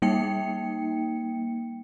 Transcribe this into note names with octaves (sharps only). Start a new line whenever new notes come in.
G3 A#3 D#4 G5 C#7